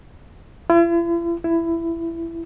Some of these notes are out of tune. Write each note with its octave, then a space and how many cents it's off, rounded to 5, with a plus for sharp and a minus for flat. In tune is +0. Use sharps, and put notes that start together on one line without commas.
E4 +45
E4 +15